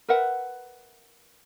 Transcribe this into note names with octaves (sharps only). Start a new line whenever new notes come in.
A#4 B4 E5 F#5